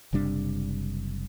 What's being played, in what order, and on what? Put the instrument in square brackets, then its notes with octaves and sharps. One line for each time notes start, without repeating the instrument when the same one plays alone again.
[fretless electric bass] F#1 C3 G3 D4